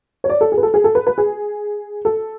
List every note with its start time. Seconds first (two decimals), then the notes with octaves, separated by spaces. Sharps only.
0.24 C#5
0.29 D5
0.41 A4
0.52 G#4
0.58 B4
0.63 A4
0.74 G#4
0.84 A4
0.95 B4
1.07 B4
1.18 G#4
2.05 A4